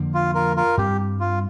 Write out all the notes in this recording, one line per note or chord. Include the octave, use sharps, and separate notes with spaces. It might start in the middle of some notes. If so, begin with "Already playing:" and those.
Already playing: F2 D3 F3 A#3
F4
F4 A#4
F4 A#4
G2 G3 C4 G4
F4